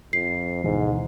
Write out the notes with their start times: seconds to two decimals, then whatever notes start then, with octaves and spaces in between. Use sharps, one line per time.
0.13 F2 C7
0.64 D2 G#2 B2 E3